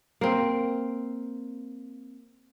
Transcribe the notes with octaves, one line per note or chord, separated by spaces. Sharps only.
A#3 C4